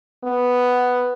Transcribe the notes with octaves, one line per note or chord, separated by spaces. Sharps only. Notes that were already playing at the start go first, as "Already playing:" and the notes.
B3